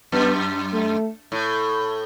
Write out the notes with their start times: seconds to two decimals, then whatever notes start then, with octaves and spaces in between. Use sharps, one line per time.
0.12 F#2 B3
0.73 A3
1.32 A2